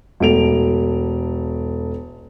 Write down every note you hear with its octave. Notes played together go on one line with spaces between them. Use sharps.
E1 A3 D7 F7